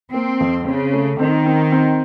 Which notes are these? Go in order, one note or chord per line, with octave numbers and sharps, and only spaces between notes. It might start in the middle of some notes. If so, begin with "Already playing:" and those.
A#3 C4
F2
C#3 C4
A3
D#3 C4
C4
C4